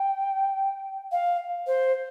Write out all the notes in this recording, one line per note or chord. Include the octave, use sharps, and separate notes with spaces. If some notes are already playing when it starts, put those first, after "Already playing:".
Already playing: G5
F5
C5